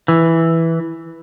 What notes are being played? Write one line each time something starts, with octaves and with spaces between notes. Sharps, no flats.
E3